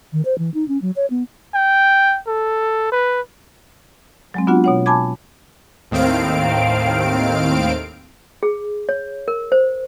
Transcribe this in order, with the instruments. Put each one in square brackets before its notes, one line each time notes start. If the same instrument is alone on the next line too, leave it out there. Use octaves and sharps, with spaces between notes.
[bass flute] D#3
C5
E3
D#4
C#4
F#3
C#5
B3
[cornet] G5
A4
B4
[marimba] F#3 G#3 C4
B3 D4 F4 F#4 F#5
B2 C#5 F#5
G#5 A5 B5 D6 G#6
[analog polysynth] D#2 A2 D#3 C4 F5 D7
[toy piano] G#4
C#5
A#4
C5